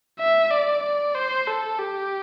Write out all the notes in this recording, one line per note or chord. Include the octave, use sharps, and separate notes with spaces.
E5
D5
D5
C5
A4
G4